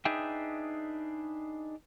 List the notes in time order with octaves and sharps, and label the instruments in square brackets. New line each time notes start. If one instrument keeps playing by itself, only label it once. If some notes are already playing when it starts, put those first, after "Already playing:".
[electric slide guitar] D4 D#4 G#4 B4 E5 G5